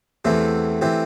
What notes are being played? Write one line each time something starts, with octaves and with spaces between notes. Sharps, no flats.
E2 E3 A3 C4 G4
E3 C4 G4